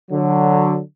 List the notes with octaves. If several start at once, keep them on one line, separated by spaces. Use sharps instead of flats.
D3 F#3